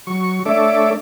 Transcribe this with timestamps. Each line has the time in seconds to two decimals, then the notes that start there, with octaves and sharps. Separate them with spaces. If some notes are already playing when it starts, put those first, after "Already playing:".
0.07 F#3 C#6
0.46 A3 D4 A4 C#5 E5 D6